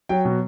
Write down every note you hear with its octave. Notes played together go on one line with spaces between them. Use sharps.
F#3 G5
B2